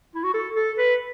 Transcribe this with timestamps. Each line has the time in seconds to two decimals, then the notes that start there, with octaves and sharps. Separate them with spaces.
0.15 E4
0.24 F#4
0.34 A4
0.56 A4
0.78 B4